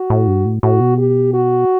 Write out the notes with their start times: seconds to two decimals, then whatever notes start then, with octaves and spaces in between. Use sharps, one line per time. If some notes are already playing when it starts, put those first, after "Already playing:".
Already playing: F#4
0.10 A2
0.28 G2
0.46 A2
0.63 A2 F#4
0.81 B2
0.98 G4
1.34 F#4